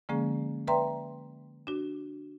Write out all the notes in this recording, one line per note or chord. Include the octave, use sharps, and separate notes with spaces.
D3 F3 G#3 A#3 C#4 G#4
B4 D5 E5 G5 A#5 C6
D4 F#4